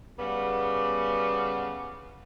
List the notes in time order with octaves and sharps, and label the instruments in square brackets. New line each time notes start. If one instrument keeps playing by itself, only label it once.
[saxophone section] C#3 G3 B3